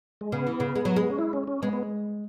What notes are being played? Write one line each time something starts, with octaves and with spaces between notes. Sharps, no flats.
G#3
C#3 B3
E3
C#3
G#3
F#3
G#3
C#4
E4
C#4
C#4
G#3 B3
B3